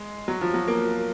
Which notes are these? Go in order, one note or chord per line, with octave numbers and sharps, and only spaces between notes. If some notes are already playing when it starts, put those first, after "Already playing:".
Already playing: G#3
F#3
F3
F#3
A#3